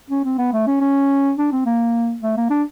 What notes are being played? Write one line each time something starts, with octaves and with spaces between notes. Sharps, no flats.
C#4
C4
B3
A3
C#4
C#4
D4
C4
A#3
A3
A#3
D4